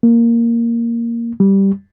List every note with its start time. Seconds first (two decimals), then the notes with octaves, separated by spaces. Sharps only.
0.03 A#3
1.40 G3